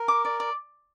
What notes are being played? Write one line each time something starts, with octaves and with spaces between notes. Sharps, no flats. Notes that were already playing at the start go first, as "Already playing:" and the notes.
Already playing: A#4
D6
D5
D5